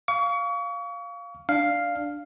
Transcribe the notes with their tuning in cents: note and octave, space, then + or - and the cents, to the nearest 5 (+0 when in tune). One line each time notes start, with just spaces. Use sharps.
F5 +0 C#6 +35
D4 +0 F5 +0